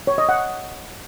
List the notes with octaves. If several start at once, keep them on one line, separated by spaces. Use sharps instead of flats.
C#5
D#5
F#5